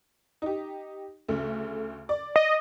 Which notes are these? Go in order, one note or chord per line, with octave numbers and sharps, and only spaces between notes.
D#4 G4
D2 C#3 A3
D5
D#5